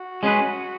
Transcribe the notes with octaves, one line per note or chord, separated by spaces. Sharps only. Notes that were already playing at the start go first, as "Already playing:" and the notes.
Already playing: F#4
G#3 C#4 G#4 B4